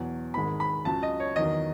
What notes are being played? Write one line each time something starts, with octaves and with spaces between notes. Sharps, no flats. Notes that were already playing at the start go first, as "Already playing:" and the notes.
Already playing: E2 B2 F#3
G#1 G#2 D#3 G#3 B5
B5
C#2 C#3 F#3 A5
D#5
C#5
E2 D#3 F#3 D#5